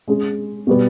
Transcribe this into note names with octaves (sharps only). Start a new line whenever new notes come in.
G#3 C#4 G#4
B2 G3 B3